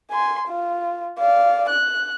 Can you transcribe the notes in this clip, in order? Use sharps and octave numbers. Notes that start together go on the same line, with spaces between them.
G#5 C6
F4
D5 F5
F#6